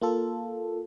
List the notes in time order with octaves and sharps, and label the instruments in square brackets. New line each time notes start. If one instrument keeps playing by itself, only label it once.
[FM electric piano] A#3 F4 A4